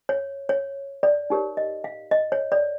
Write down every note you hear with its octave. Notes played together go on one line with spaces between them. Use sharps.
C#5
C#5
D5
D#4 G4 A#4 C#5
D#5
F5
D#5
C#5
D5